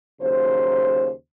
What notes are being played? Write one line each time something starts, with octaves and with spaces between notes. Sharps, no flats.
D#2 C#3 F#3 C5